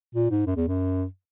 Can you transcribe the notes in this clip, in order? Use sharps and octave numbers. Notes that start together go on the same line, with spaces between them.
A#2
G#2
F#2
E2
F#2